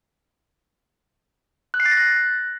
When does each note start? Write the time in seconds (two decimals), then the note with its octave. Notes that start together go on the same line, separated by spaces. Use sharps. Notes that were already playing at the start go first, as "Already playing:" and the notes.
1.74 F#6
1.80 C7
1.86 A6
1.91 A#6
1.97 F#6